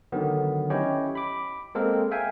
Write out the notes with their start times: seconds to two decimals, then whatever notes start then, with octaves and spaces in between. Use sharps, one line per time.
0.12 D3 D#3 F#3 B3
0.70 C#4 E4 G4 C#5 D#5 G5
1.15 B5 D6
1.75 G#3 A#3 C4 A4 A#4
2.11 E5 F5 G5 G#5